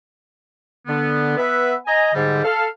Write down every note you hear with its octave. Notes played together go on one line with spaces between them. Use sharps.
D3 B3
B3 B4 E5
D#5 G#5 A#5
G#2 D3 G3
A4 F5